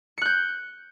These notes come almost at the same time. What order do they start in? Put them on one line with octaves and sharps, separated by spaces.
C#7 F#6 G6